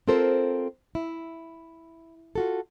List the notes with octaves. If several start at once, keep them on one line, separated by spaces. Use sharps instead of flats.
C4 F4 A4 A#4 C5
E4
F4 F#4 A4